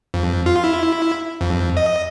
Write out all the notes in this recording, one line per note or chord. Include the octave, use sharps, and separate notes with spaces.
F2
F4
E4
F2
D#5